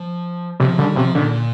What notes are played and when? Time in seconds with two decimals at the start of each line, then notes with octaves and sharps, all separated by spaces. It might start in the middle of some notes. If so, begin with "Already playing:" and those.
Already playing: F3
0.60 C3 F3
0.78 D3 G3
0.96 C3 F3
1.15 A#2 D3